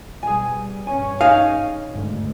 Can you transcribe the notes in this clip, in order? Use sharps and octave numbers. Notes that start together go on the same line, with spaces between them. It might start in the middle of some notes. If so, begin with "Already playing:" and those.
B2 G3 G#4 G#5
G2 C#4 G#5
D#4 G#4 F5 G#5
G#1 D2 G2